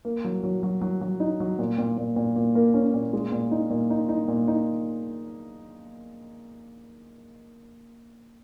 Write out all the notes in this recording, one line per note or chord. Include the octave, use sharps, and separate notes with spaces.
A#3
F#3
F#3
F#3
F#3
F#3
D#4
F#3
A#2
A#2
A#2
A#2
A#2
A#3
C#4
A#2
G#3
A#2
D#4
A#2
D#4
D#4
A#2
D#4